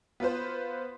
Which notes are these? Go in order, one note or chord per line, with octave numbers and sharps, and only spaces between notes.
B3 F4 B4 C5